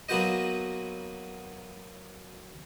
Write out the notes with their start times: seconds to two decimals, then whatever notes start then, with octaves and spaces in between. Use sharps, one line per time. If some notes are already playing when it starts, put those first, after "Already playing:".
0.09 F#3 A#3 B3 F#4 C5 D#5